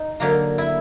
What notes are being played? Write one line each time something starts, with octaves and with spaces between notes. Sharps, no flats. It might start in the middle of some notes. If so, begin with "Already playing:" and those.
Already playing: D#4
D3 F#3 A#3
E4